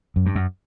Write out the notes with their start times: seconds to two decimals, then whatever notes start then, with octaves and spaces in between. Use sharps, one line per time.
0.16 F#2
0.26 G2
0.35 F#2